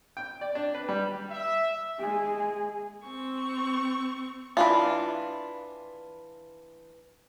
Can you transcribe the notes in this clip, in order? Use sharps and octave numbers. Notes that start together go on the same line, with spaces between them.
G5
D5
D4
B4
G3
E5
G#3 G#4
C4 C#6
E3 D4 F4